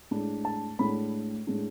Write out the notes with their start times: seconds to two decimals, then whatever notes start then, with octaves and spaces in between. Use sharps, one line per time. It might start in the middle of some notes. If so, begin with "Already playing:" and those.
0.11 A2 G#3 D4
0.45 A5
0.79 A2 G#3 D4 B5
1.47 A2 G#3 D4